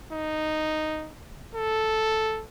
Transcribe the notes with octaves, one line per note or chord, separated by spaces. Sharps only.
D#4
A4